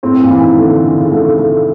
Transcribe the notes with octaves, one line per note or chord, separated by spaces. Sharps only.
A2 C4
A#2
E3
D#3
A3
D3
D3 E3
C#3
D3 A3
A3